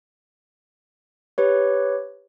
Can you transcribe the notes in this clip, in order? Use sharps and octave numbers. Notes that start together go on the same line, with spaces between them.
G4 B4 C#5